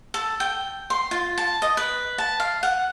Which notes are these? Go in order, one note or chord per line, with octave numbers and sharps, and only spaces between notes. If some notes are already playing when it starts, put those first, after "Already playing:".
A4
G5
C6
F4
A5
D#5
B4
A5
F5
F#5